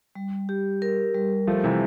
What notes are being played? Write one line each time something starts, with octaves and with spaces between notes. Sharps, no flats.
G3
G4
A#4
G3
F3 A3 G4
C3 E3